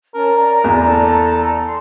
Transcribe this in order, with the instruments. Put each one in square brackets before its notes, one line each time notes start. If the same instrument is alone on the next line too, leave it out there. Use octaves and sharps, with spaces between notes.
[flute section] C#4 A5 [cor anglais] A#4
[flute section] D5 A#5
[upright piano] E2
[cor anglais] A4
[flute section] C6